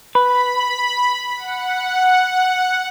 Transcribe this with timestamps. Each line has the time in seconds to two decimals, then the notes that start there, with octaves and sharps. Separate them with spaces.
0.15 B4 B5
1.36 F#5